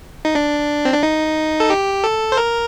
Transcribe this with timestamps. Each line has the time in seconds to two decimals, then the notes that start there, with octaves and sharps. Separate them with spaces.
0.25 D#4
0.35 D4
0.85 C4
0.94 D4
1.03 D#4
1.60 A4
1.70 G4
2.04 A4
2.32 C5
2.37 A#4